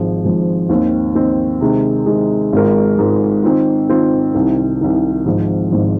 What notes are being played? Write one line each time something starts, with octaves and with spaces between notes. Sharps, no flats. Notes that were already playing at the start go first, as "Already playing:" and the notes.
Already playing: G#1 G#2 F3 G#3
G#1 G#2 F3 G#3
D#2 D#3 C4
D#2 D#3 C4
C3 D#3 G#3
C3 D#3 G#3
G#1 G#2 G#3 F4 A#4
G#1 G#2 G#3 F4 A#4
D#3 C4 F4
D#3 C4 F4
C2 C3 D#3
C2 C3 D#3
G#1 G#2 F3
G#1 G#2 F3